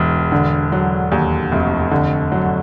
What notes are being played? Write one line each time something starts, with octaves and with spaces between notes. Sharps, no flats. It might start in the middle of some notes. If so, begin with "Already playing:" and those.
Already playing: E1 E2
D3
F#3
D#2
F1
D3
F#3